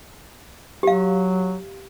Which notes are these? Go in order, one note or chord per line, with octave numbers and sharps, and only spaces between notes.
F#3 G4 F5